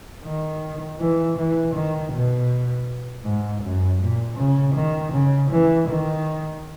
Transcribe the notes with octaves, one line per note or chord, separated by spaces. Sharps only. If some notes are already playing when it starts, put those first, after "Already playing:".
D#3
E3
E3
D#3
B2
G#2
F#2
A#2
C#3
D#3
C#3
E3
D#3